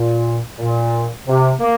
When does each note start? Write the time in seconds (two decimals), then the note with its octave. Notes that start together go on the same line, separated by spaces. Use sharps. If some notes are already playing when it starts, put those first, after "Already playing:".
Already playing: A#2
0.59 A#2
1.27 C3
1.60 A#3